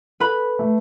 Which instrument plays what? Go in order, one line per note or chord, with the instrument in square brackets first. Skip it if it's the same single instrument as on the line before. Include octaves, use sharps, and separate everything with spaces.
[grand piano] A4 [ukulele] B4 B5
[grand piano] A3